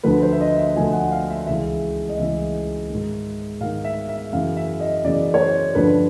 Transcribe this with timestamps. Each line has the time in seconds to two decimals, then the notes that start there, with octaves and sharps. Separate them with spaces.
0.03 D2 D3 F3 B4
0.22 C5
0.32 E5
0.40 D#5
0.58 E5
0.76 D2 D3 F3 G#5
0.93 F#5
1.12 F5
1.29 E5
1.46 C#2 C#3 E3 E5
2.09 D#5
2.19 C#2 C#3 E3 E5
2.90 G#2 D#3
3.61 G#2 D#3 F5
3.84 E5
4.09 E5
4.32 F#2 C#3 E3 F5
4.56 E5
4.80 D#5
5.04 F#2 C#3 E3 D5
5.34 C#5
5.40 C5
5.75 G2 D3 F3 B4